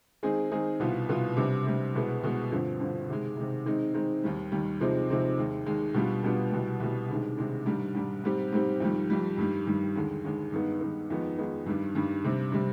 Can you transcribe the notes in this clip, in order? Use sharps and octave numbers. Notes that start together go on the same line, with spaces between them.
D#3 G#3 C4 D#4 G#4
D#3 G#3 C4 D#4 G#4
C2 B2 B3 F4
C2 B2 B3 F4
C3 G3 D4
C3 G3 D4
C2 B2 G#3 B3
C2 B2 G#3 B3
G2 D3 F3 C4
G2 D3 F3 C4
C3 D#3 G#3
C3 D#3 G#3
D#3 G#3 C4 D#4
D#3 G#3 C4 D#4
D#2 D#3 G3
D#2 D#3 G3
C3 F3 G#3 C4 D#4
C3 F3 G#3 C4 D#4
D#2 D#3 G#3
D#2 D#3 G#3
B2 G3 B3 D4 F4
B2 G3 B3 D4 F4
C2 B2 G3
C2 B2 G3
C3 D#3 G#3 D4
C3 D#3 G#3 D4
G#2 D#3 G3 D4
G#2 D#3 G3 D4
G#2 G3 C4 G4
G#2 G3 C4 G4
F2 D#3 G3
F2 D#3 G3
G2 D#3 G3
G2 D#3 G3
D#2 D3 G#3
D#2 D3 G#3
G2 D#3 G#3 B3 D#4
G2 D#3 G#3 B3 D#4
F2 D#3 G#3 B3 D#4
F2 D#3 G#3 B3 D#4
G2 D#3 G3 D4
G2 D#3 G3 D4
C3 G3 D4
C3 G3 D4